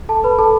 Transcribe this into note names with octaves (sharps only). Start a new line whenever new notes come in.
A4 A5
B4 B5
A4 A5